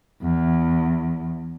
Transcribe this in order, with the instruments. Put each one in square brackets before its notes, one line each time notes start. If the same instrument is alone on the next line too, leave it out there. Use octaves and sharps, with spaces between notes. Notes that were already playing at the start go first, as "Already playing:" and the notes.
[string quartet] E2